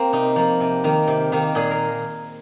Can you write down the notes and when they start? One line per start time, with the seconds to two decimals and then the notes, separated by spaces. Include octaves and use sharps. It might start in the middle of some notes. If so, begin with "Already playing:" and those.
Already playing: A#3 C4
0.13 C3 D#4
0.36 F3 A#3
0.60 C3
0.84 D#3 A#3
1.08 C3
1.32 D#3 A#3
1.55 A#2 G#4
1.71 A#4